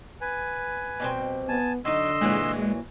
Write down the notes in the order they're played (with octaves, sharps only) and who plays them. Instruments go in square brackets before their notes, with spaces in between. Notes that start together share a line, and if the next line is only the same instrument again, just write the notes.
[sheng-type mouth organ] B4 G#5
[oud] B2 G3 C4
[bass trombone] B3 [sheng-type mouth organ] G#5 A5
[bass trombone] D3 [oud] F#3 D#4 [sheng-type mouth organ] D#5 C6 E6
[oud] A#2 E3 F#3 [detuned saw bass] G#3